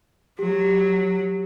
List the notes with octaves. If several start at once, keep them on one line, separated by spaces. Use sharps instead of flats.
F#3 G4